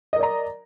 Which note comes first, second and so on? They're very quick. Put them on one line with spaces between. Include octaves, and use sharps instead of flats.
D#5 A#4 D5 A#5